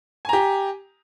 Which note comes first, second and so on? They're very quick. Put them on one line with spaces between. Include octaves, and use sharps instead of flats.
G#5 A#5 G4